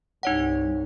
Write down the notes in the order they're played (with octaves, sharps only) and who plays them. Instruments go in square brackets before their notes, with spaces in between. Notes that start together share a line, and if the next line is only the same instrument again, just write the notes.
[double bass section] C2 G2 [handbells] D#4 C#5 F#5